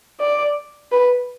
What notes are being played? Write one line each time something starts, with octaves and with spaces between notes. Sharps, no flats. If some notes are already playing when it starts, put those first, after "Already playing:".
D5
B4